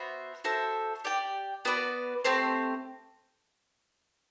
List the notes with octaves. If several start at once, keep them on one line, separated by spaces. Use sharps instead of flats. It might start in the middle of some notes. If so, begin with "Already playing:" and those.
Already playing: B3 F#4 C5 E5
F#4 A4 C5 E5
G4 D5 G5
B3 F#4 B4 D5
A3 C4 G4 C5